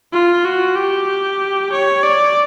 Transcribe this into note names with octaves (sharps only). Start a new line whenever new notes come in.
F4
F#4
G4
C#5
D5